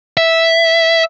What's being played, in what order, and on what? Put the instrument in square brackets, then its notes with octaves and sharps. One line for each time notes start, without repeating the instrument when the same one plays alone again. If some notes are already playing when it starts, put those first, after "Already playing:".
[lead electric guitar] E5